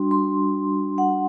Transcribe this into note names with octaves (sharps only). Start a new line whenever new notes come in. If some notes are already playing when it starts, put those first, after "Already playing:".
Already playing: G3 D4 F#4 C6
C6
F#5